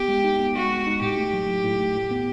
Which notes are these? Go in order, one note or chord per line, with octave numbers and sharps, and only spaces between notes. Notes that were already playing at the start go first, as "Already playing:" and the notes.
Already playing: B3 G4
G#3
D#4
B3
G#3 F#4
G#3
D#4
A2 G4
A3
F#3
A2
A2
A3
A2
B3